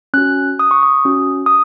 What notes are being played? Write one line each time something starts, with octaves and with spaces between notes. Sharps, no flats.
C#4 F#4 F#6
D#6
C#6
D#6
C#4 F#4
D#6